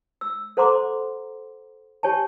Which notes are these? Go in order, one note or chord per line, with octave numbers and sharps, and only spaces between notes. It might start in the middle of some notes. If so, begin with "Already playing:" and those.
E6
A4 C5 F#5 A#5 C6 D6
G4 C#5 G#5 A5